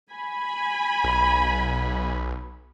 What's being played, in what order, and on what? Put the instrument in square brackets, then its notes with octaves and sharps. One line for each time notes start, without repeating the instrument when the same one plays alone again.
[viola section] G#5 B5
[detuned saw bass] B1